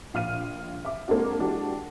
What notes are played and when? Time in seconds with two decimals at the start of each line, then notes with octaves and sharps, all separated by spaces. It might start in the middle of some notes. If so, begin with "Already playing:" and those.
0.14 A#1 F5 F6 D#7
0.85 E5 D6
1.08 G#3 A#3 C4 D4 F#4
1.39 E3 G#3 D4 F#4 G4